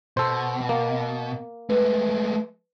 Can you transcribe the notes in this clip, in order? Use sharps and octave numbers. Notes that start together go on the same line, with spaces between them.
B2 A4 C5
A#3
G#3 A3 B4